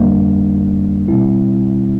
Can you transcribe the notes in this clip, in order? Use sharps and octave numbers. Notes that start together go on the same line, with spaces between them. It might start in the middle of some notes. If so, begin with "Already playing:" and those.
Already playing: F2 D3 G3 A#3 D4
B2 G3 C4 E4